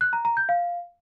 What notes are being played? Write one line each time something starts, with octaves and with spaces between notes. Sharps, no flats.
F#6
A#5
A#5
G6
F5